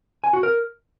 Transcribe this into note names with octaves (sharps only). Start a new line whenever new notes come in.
G#5
F#4
A#4